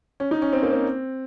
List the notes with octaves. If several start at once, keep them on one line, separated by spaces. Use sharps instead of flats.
C#4
D#4
C#4
C4
A#3
C4